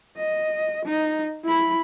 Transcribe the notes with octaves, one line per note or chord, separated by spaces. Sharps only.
D#5
D#4
E4 B5